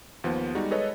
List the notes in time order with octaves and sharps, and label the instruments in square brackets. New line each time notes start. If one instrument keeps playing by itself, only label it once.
[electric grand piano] D#2 F3 B3
G3 G#3 D#4 F#4
G#3 G#4 A4 B4 C#5 D#5